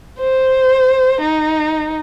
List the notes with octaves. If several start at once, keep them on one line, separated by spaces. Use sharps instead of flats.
C5
D#4